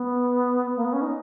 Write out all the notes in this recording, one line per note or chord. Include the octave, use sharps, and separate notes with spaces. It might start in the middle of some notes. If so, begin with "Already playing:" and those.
Already playing: B3
A#3
B3
C#4
D#4